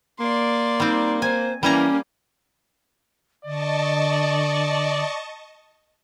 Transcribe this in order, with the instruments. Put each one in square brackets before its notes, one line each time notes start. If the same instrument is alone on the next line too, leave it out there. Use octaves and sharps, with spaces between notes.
[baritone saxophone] A#3 [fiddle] D5 C6
[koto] G3 C4 [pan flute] D#4
[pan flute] C5 [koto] G#5
[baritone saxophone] E3 [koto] G3 G#5 A#5 [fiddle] A#3 [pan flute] C#4
[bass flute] D3 [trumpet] D5 [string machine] D#5 A5 C#6